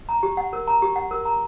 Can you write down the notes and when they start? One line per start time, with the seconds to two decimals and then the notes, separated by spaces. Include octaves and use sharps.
0.09 A#5
0.23 G4
0.37 F#5
0.53 A#4
0.68 A#5
0.82 G4
0.96 F#5
1.11 A#4
1.25 A#5